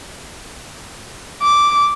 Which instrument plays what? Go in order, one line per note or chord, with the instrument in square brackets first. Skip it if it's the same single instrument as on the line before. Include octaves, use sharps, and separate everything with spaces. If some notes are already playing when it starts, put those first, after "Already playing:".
[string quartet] D6